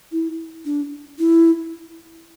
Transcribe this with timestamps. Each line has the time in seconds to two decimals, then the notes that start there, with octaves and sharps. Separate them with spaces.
0.12 E4
0.65 D4
1.19 E4